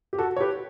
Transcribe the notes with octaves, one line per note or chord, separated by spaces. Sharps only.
G4
F#4 A4
C#5
G4 B4